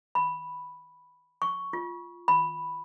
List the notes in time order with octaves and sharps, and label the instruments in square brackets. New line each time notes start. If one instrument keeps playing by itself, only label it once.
[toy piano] B5
C#6
F4
B5